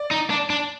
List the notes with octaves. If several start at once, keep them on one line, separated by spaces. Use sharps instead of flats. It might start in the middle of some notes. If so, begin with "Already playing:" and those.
Already playing: D5
D#4
D4
D4